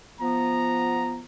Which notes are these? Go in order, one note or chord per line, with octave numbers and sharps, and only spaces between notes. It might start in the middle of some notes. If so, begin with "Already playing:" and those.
F3 B3 A#5